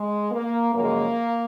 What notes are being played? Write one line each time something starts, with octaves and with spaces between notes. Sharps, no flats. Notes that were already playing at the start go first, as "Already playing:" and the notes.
Already playing: G#3
A#3
F#2 C#3 F3 G#3 A#3